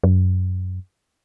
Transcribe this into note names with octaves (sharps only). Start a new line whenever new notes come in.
F#2